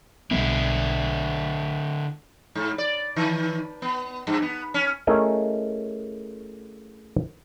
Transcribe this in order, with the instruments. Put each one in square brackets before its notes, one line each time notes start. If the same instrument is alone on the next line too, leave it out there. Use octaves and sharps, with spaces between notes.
[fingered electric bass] B1 G3 B3 [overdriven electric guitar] D3 E4
[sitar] G#2
D5
D#3
B3
G2
B3
C#4
[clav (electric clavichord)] A3 C#4 E4 G#4 A#4 D#5